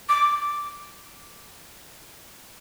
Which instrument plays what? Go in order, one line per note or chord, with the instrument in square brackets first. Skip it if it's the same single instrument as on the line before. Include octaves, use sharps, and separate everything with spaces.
[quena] D6